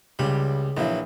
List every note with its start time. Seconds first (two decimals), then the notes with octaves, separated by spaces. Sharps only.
0.19 C#2 C#3 G3 G4 B5
0.77 A#1 E3 F#3 A#3 E4